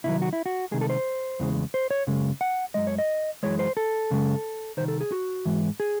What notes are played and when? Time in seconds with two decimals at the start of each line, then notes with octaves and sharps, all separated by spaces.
0.04 C2 C3 D#3 F#3 E4
0.22 F#4
0.33 E4
0.46 F#4
0.71 C2 C3 D#3 G#3 G#4
0.81 A4
0.90 C5
1.40 E2 C#3 E3 G#3
1.74 C5
1.91 C#5
2.07 F#2 C#3 G#3
2.41 F#5
2.74 F#2 E3 G#3 D#5
2.87 C#5
2.99 D#5
3.43 F#2 C#3 E3 G#3 C#5
3.59 C5
3.77 A4
4.10 F#2 C#3 G#3
4.77 C2 C3 D#3 C5
4.88 A4
5.01 G#4
5.12 F#4
5.45 G#2 E3 G#3
5.80 G#4